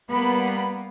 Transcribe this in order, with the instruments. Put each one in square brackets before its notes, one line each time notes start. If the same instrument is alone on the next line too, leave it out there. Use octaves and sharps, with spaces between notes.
[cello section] G3 A#3 B3 [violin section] B5